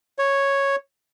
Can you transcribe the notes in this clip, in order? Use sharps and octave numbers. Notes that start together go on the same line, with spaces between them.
C#5